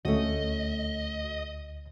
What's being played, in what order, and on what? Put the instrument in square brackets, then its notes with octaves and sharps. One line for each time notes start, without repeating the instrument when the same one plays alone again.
[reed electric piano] D2 [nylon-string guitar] A3 C#4 F#4 [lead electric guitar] D#5